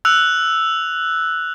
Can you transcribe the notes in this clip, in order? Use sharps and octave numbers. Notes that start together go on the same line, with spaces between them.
E6 F#6 F7